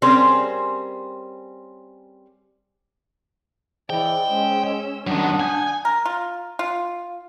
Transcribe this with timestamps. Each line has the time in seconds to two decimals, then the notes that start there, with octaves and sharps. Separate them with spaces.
0.02 G3 C4 C#4 G#4 A#4 C5
3.90 E3 G#4 C5 D5 D#5 G5
4.30 G#3 C#4 E6
5.07 F#2 D#3 G3 C#4 D4 F#5 D#6
5.40 G#5 G6 G#6
5.85 A#4
6.06 F4
6.59 F4